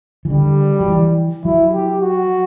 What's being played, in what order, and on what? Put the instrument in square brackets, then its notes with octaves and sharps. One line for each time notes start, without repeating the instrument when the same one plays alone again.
[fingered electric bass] E3
[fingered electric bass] D3 [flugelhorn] G3
[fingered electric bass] F#3
E3
[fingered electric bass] F#3 [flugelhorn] E4
[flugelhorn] G4
F#4